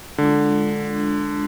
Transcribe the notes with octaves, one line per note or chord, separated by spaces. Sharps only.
D3 G#3 D4 F4